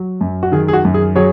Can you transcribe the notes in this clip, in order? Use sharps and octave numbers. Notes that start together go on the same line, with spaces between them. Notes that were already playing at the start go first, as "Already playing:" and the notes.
Already playing: F#3
F#2
F#4
D#3 G#4
G#4
F#4
F#2
G#4
F#3 G#4 C#5